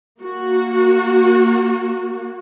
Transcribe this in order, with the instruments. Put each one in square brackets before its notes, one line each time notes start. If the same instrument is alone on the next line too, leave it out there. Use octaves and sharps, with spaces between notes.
[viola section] A#3 F#4